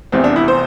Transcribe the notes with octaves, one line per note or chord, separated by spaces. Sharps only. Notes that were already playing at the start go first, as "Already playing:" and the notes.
F1 E2 C3 C4
D4
E4
C5